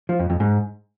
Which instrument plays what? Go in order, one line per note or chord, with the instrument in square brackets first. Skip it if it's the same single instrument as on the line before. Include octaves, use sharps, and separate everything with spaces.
[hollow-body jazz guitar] F3
F2
F2
G#2